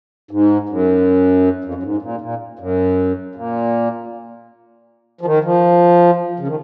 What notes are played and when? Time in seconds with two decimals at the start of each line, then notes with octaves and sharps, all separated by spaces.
0.31 G#2
0.69 F#2
1.64 F2
1.74 F#2
1.83 G#2
2.02 A#2
2.21 A#2
2.59 F#2
3.35 A#2
5.21 F3
5.26 D#3
5.44 F3
6.40 C#3
6.48 D#3